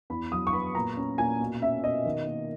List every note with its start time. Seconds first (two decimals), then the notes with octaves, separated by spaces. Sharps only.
0.10 E2 B5
0.32 F#3 D#6
0.47 C#6
0.53 B3 B5
0.75 A#2 A#5
0.97 C#4
1.18 A#2 G#5
1.40 B2
1.62 C#4 E5
1.83 B2 D#5
2.05 D#3
2.26 A#3